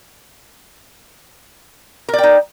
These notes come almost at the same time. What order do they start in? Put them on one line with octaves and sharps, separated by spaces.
A#4 D5 G5 D#4